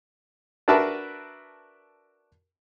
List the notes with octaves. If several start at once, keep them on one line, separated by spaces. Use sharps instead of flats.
D4 F#4 A#4 B4 E5 A5